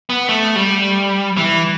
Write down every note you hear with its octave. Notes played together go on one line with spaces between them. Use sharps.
B3
A3
G3
E3